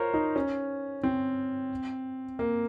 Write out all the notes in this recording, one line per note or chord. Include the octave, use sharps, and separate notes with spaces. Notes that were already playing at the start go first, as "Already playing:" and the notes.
Already playing: F4 A#4 C5 C#5
D#4
C#4
C4
A#3